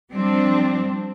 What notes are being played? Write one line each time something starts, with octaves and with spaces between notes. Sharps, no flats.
F3 G3 C4 D4